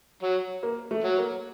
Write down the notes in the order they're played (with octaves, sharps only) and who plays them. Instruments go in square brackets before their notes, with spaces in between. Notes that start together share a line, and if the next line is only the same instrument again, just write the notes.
[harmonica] F#3
[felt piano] A#3
A3
[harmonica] F#3
[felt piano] A#3